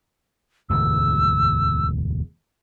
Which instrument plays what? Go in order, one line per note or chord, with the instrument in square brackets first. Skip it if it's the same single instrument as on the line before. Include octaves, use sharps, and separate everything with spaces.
[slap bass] E1 D2 G#2 [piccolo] E6